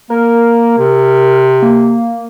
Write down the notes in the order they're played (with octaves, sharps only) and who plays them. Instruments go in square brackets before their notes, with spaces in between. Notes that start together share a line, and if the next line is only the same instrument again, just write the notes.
[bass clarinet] A#3 [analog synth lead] A#4
[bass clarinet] C3
[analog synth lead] A#3